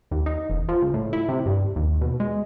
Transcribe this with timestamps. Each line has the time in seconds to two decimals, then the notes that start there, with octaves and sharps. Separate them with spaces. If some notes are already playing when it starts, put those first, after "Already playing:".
0.11 D#2
0.26 D#4
0.50 E1
0.68 F3
0.82 C#2
0.94 A2
1.13 E4
1.29 C3
1.46 G2
1.76 D#2
2.01 B2
2.20 G#3